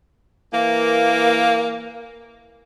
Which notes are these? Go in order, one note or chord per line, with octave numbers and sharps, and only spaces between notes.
E3 A#3